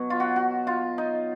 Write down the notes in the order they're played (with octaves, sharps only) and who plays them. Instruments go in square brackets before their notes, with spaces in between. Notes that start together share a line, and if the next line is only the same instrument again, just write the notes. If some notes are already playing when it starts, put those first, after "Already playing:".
Already playing: [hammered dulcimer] B2 F#3
F4
F#4
F#4
F4
D#4